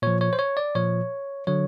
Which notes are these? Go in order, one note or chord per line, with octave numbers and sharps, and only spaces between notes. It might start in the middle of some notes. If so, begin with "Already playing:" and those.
A#2 F3 C#5
C#5
C5
C#5
D5
A#2 F3 C#5
D3 F#3 C#5